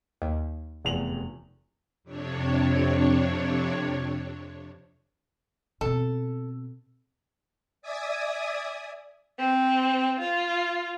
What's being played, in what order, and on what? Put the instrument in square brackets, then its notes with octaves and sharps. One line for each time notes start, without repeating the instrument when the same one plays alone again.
[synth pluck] D#2
[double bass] F1 [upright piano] E2 F7 F#7
[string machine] F2 C3 D4 C#5
[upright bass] B2 C4 [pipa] A4
[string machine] D5 E5 G#5 D#6
[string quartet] C4
F4